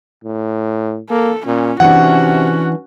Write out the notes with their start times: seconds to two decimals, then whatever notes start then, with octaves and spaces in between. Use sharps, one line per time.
0.24 A2
1.10 A#3 A4
1.46 A#2 C#4
1.80 C3 E3 C#4 D4 F#4 F#5